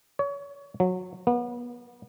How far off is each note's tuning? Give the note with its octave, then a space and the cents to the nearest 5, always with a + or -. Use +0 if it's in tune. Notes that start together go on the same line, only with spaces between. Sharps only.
C#5 +30
F#3 -20
B3 -30